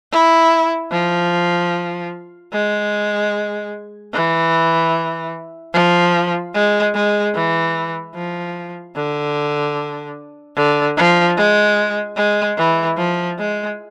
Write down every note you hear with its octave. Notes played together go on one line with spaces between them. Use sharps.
E4
F3
G#3
E3
F3
G#3
G#3
E3
F3
D3
D3
F3
G#3
G#3
E3
F3
G#3